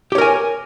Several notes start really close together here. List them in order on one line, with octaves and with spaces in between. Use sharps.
G4 C#5 A#4 G#5